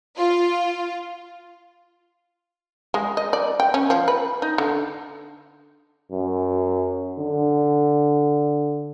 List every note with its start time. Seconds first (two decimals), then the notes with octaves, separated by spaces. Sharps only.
0.18 F4
2.94 G#3
3.17 D#5
3.33 D5
3.60 G5
3.74 C#4
3.90 F3
4.08 B4
4.42 D#4
4.58 D3
6.12 F#2
7.19 D3